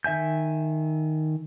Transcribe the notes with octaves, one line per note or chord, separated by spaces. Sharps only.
D#3 E5 G#5 G6